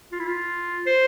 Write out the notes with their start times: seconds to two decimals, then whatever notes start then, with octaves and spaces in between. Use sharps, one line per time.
0.12 F4
0.20 E4
0.27 F4
0.87 C5